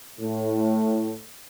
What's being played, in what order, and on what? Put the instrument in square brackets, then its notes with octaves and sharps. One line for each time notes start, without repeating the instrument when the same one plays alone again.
[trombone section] A2 A3